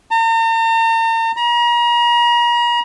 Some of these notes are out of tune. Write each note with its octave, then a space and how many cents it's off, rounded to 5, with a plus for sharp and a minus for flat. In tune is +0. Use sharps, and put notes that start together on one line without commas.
A#5 -45
A#5 +40